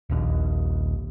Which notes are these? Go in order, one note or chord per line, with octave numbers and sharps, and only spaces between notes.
D#1 A#1 D#2